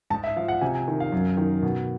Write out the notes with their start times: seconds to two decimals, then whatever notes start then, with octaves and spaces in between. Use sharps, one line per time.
0.10 G#2 A5
0.24 E5
0.36 F3 F5
0.48 F#5
0.61 C3 G#5
0.75 G#5
0.88 D#3
1.00 F5
1.12 F#2
1.37 D#3
1.63 B2